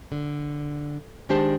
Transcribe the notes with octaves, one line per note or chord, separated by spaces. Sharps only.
D3
D#3 G#3 D4 G4 C5 A5